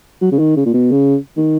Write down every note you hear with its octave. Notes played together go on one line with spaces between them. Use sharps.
F#3
C#3
D#3
C#3
A#2
B2
C#3
D#3